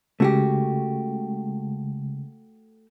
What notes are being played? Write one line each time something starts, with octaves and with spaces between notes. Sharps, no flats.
C#3 G#3 A3 F#4 G4